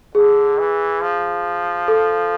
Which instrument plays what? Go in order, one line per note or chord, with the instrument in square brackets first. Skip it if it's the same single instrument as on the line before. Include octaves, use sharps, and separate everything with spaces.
[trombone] D3 [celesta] G#4
[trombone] E3
F3
[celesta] A4